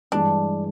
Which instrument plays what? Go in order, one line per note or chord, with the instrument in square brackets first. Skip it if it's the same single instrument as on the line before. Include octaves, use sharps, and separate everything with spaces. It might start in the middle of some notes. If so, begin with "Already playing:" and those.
[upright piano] G2 E3 G#3 [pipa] D4